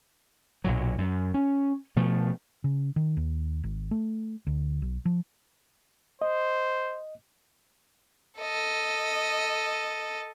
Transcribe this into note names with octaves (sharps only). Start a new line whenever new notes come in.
B1 A#2 F#3
F#2
C#4
B2 F3 A3
C#3
D#3
D#2
G#1
A3
D2
B1
F3
C5 D#5
A4 D#5